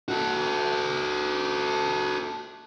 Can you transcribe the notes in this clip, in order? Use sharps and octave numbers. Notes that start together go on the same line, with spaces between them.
F#4 A4